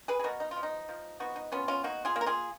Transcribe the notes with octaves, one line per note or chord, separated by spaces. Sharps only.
G#4 B4
G#4
B2 F#4 A#4
D#4
F4
F3
D#4
F3
B3 D#4 F#4
D#4
B3 C#4 F4
C#4 F4
A#3 D#4 F#4
F4 G#4
A#3
A#4
F4 G#4